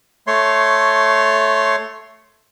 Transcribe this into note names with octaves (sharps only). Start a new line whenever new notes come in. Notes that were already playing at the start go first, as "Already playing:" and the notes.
A3 C#5 C6